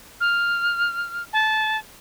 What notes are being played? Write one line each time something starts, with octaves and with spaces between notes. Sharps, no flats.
F6
A5